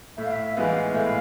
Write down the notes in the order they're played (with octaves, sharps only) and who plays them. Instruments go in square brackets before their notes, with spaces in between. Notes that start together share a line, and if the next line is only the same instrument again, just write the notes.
[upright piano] A2 [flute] E5
[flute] F5
E5
[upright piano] E3 G#3 B3 [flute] F5
[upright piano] A2